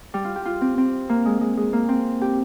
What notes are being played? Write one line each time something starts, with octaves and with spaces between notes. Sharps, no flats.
G3
F4
G4
F4
C4
C4
A#3
G#3
G#3
G#3
A#3
C4
G4